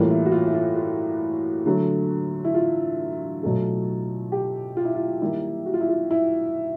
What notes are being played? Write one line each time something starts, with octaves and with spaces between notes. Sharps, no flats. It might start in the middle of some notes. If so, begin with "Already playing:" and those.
Already playing: A2 E3 G3 A#3 F4
E4
F#4
F4
E4
F4
F4
D3 F#3 A3
E4
F4
B2 F#3 A3
G4
F4
E4
F4
D#3 G3 A#3 E4
F#4
F4
E4
F4
E4